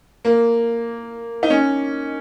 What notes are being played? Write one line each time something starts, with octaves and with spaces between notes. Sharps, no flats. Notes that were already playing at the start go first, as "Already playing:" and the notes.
A#3
D#4
C#4